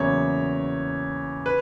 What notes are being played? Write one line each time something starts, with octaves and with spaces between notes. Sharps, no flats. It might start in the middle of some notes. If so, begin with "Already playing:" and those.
Already playing: E2 C#3 F#3 A#3 C#5
B4